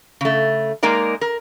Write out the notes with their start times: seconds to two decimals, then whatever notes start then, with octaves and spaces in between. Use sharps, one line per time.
0.21 C#3 A3
0.83 G#3 A#3 D#4 A#4 D5
1.21 A#4